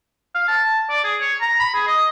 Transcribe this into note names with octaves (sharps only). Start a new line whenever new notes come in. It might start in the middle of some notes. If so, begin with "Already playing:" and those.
F5
A5
D5
G#4
C#5
A#5
B5
G#4
D#5